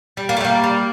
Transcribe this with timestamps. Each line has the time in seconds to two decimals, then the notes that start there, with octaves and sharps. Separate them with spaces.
0.17 G3
0.29 A#3
0.37 A3
0.41 G3 A#3
0.64 G3